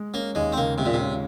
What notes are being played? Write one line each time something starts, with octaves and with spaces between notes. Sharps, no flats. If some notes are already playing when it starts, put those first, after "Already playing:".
Already playing: G#3
A#3 C#4
D#2 G#3
C4
C#3 A#3
C3 G#3
A#2
C3
C#4